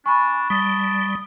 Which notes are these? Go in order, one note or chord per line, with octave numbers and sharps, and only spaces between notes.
D4 G#5 B5 C#6
G3 A5 D#6